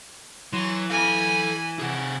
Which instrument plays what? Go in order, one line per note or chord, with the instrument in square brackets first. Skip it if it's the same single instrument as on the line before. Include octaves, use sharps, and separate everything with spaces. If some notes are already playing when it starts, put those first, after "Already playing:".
[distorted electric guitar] E3 [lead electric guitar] F#3 [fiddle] C6 C#6
[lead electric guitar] A4 F5 [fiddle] G#5 B5
[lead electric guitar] C3 G#4 [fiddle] F#5